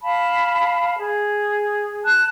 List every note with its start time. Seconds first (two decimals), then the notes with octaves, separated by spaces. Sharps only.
0.02 F5 A5 B5
0.97 G#4
2.04 A5 F#6